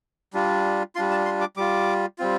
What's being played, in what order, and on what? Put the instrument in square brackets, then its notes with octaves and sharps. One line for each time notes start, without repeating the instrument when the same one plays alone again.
[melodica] G3 D4 F4
G3 D4 F4 C6
A5
C6
D6
G3 F4 D6
G3 C4 F4